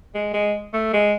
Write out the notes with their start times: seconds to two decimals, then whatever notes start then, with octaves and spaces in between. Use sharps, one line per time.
0.14 G#3
0.34 G#3
0.73 A3
0.93 G#3